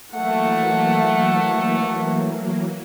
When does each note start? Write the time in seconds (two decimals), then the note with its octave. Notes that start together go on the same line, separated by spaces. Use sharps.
0.14 E3 F#3 A3 A#3 F#5